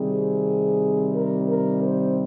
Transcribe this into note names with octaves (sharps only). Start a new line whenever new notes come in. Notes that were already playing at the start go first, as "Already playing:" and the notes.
Already playing: C3 D#3 G3 C4 G#4
A#4
A#4
C5